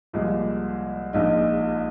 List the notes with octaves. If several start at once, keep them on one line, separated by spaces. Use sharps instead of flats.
C2 A#2 F3 G#3
A#1 A#2 G#3 D#4